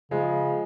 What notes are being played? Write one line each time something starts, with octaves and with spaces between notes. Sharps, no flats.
C#3 F3 G#3